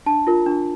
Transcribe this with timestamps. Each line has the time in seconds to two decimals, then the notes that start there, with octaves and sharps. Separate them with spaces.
0.06 D4 A5
0.27 F4 A#4
0.46 D4